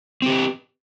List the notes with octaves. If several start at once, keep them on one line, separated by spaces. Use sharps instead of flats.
C4 G4 B4